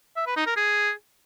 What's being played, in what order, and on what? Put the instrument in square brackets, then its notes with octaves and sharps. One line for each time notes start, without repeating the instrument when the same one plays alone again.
[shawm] E5
B4
D#4
A#4
G#4